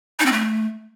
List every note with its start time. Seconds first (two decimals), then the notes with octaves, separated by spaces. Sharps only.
0.20 D#4
0.26 C4
0.32 A3